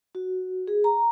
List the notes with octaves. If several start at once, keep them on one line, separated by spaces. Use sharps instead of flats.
F#4
G#4
A#5